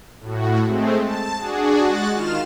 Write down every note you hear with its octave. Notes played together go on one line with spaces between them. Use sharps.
A2 F#4
G#3 A3 C4
A5
D4 F#4 G#4
G#3 F#4 F#6 A6
D#3 F4 F6 E7